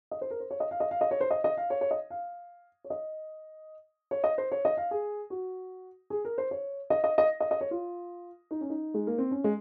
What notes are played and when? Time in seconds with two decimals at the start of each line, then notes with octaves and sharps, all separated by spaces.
0.11 D#5
0.21 C5
0.30 A#4
0.40 C5
0.51 C#5
0.60 D#5
0.71 F5
0.80 D#5
0.91 F5
1.01 D#5
1.11 C#5
1.20 C5
1.31 D#5
1.44 D#5
1.57 F5
1.70 C#5
1.81 C#5
1.91 D#5
2.10 F5
2.84 C#5
2.90 D#5
4.11 C#5
4.24 D#5
4.38 C5
4.52 C#5
4.65 D#5
4.77 F5
4.91 G#4
5.30 F#4
6.10 G#4
6.25 A#4
6.38 C5
6.51 C#5
6.90 D#5
7.04 D#5
7.18 D#5
7.40 D#5
7.51 D#5
7.61 C#5
7.71 F4
8.51 D#4
8.61 C#4
8.70 D#4
8.94 G#3
9.07 A#3
9.18 C4
9.31 C#4
9.44 G#3